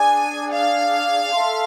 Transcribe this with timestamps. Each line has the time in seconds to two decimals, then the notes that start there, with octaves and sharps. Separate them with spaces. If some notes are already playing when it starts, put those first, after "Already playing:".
Already playing: D4 G#4 D5 G#5
0.51 F5
1.32 A4 E5 A5 C6